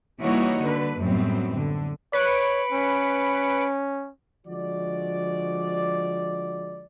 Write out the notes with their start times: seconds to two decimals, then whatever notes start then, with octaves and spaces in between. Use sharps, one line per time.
0.21 E3 G3 A#3 D#4 F#4 C#5
0.63 D3 B4
1.00 F#2 A2 F#3 G3 B3 C4
1.54 D3
2.13 B4 C#5 C#7 D7
2.72 C#4
4.47 D3 F3 G#3 F#4 D5